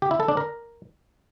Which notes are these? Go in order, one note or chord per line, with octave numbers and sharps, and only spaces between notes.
G4
E4
A4
D4
A#4